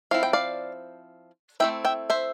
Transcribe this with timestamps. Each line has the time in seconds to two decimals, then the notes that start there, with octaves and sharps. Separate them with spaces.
0.11 F3 C4 E4 F5
0.23 G5
0.33 D5 F5
1.60 A3 C4 E4 E5 G5
1.85 E5 G5
2.10 C5 E5